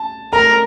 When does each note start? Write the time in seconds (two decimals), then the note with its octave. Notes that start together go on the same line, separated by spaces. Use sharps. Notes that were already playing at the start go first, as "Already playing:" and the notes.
Already playing: A5
0.33 A#4 A#5